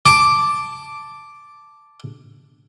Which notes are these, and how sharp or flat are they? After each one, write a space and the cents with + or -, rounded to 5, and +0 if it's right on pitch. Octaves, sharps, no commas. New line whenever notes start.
A5 +0 D6 +0